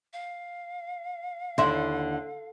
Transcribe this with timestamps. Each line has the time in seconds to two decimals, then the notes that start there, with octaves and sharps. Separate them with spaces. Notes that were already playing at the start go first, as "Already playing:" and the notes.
0.13 F5
1.58 D#2 D3 E4 D5 E5 C6